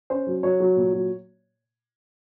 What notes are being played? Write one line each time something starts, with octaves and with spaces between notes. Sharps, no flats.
C#4 C5
F#3
F#3 C#5
F#3
A#2
F#3